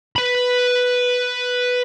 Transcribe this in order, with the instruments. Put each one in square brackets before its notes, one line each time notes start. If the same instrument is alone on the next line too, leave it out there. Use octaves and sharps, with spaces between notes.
[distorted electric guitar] B4 B5